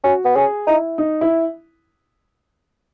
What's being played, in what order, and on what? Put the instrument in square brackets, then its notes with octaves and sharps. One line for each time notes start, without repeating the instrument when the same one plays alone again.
[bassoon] C#4 [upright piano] F#4
[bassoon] B3
[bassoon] C#4 [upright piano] G#4
[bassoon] D#4 [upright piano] E4
[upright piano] D#4
E4